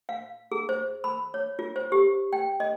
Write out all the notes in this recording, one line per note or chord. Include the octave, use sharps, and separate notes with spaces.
F5
G#4
C5
B5
C#5
F4
C5
G4
G5
D#5